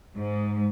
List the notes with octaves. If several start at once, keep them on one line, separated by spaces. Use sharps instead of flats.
G#2